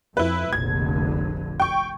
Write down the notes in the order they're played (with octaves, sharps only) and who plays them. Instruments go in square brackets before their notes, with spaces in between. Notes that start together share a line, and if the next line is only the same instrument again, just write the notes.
[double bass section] F2 [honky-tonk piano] E4 B4
[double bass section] F1 A#1 D3 [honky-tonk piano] G#6
[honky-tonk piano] G5 C#6